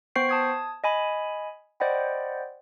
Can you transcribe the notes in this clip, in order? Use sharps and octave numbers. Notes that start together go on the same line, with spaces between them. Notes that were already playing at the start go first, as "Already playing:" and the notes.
B3 C5 G5 C#6 C7 D7
A5 D#6 G#6
D#5 G#5 B5
C5 D5 D#5 F#5 G5 B5